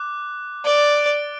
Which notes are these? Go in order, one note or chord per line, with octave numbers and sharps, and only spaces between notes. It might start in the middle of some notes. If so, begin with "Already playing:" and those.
Already playing: D6 F#6
D5 D6 A6 D7 G7